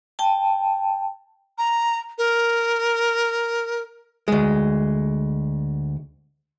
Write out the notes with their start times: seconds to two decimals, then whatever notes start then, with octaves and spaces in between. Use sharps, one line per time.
0.19 G5 A5
1.58 A#5
2.18 A#4
4.28 D2 G#3